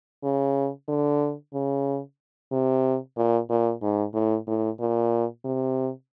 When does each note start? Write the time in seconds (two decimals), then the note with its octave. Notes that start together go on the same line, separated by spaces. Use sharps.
0.23 C#3
0.88 D3
1.54 C#3
2.52 C3
3.16 A#2
3.50 A#2
3.82 G#2
4.14 A2
4.47 A2
4.80 A#2
5.45 C3